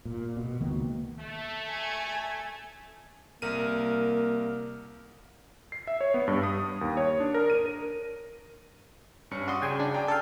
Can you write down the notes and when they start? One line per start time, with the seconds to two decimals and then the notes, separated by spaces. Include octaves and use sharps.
0.05 A#2
0.37 B2
0.60 C#2 D#3 A#3 B3
1.19 A3
1.69 G#5
3.42 C2 A#3 A#4 D#7
5.72 C7
5.87 E5
6.01 C#5
6.14 B3
6.28 G2
6.43 D#6
6.81 D#2
6.97 C#5
7.20 D4
7.34 A#4
7.50 D#7
7.66 A#4
9.31 G2 C#4 C#7
9.48 F#4 D5 C6 C#6 D#6
9.62 C#3 G5 G#5
9.80 D4
9.94 G5 G#5 A#5
10.08 A4 F5